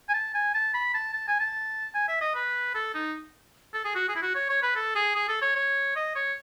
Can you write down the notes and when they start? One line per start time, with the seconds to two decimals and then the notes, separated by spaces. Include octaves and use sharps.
0.09 G#5
0.14 A5
0.34 G#5
0.54 A5
0.74 B5
0.94 A5
1.14 A5
1.28 G#5
1.40 A5
1.94 G#5
2.08 E5
2.21 D#5
2.35 B4
2.75 A4
2.94 D#4
3.74 A4
3.85 G#4
3.95 F#4
4.08 G#4
4.15 E4
4.22 F#4
4.35 C#5
4.49 C#5
4.63 B4
4.75 A4
4.95 G#4
5.15 G#4
5.28 A4
5.42 C#5
5.55 C#5
5.96 D#5
6.16 C#5